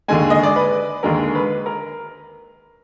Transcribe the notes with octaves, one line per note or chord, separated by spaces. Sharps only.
D#2 D3 G#3 G#5
D#5
D5
B4
D#2 D3 G#3 A#4
B4
A#4